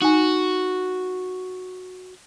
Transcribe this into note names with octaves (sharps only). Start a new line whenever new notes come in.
D#4 F#4 G#5